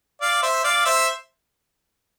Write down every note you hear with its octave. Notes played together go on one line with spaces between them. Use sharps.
D5 F5
C5 E5
D5 F5
C5 E5